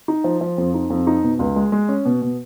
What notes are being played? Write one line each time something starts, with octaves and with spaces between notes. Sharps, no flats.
D#4
F3
F3
F2
D#4
F2
D#4
B2
C#2
G#3
G#3
C#4
B2
B2